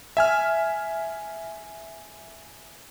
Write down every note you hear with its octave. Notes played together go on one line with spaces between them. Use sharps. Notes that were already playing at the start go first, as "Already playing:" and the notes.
E5 G#5 F6